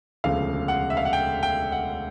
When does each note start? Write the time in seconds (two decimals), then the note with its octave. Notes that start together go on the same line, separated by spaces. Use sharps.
0.24 E1 D2 C#3 F3 F5
0.68 F#5
0.90 E5
0.97 F5
1.05 F#5
1.13 G5
1.43 G5
1.72 F#5